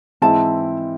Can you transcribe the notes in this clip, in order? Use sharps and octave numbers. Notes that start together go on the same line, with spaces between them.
G#2 E3 G#3 C4 E4 A5